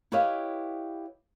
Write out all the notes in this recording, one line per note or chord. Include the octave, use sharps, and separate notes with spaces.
E4 G4 B4 C#5 D#5 F5